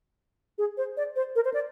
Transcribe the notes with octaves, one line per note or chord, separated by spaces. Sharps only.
G#4
C5
D5
C5
A#4
C5
D5